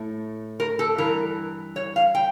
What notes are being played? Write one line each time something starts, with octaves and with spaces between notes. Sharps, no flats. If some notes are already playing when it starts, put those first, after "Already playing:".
Already playing: A2 A3
A#4
A4
G2 E3 A#4
C#5
F5
G5